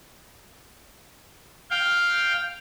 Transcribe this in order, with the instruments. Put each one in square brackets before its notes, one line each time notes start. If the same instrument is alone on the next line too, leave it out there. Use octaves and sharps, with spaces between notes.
[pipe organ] F5 G5